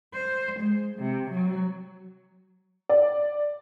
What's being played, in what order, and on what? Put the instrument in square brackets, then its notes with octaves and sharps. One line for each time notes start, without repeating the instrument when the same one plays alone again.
[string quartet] C5
G#3
C3
F#3
[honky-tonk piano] D5